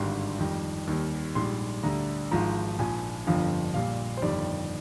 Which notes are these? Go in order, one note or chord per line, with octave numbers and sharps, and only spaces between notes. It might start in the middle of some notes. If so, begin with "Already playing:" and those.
Already playing: G#1 G2 D3 G3 C6
F2 D#3 G3
D#2 D#3 G3
A#1 G#2 G3 C6
D2 D3 G3 A#5
G#1 G#2 F3 A#5
A#1 A#2 F3 G#5
G1 F2 D3 F3 F5
A#1 A#2 G3 F5
C5
G1 F2 D#3 G3 D5